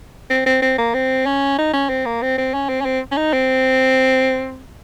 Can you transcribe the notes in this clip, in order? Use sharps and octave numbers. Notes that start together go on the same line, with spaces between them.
C4
C4
C4
A#3
C4
C#4
D#4
C#4
C4
A#3
C4
C4
C#4
C4
C#4
C4
C#4
D#4
C4